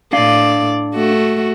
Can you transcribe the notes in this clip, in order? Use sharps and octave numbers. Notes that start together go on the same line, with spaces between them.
A2 D4 D5 F5
A3 F#4